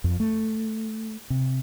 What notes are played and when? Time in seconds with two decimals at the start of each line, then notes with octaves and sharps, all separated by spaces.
0.04 F2
0.20 A3
1.30 C3